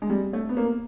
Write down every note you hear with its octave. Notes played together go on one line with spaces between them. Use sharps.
G#3
G3
A3
B3
A#3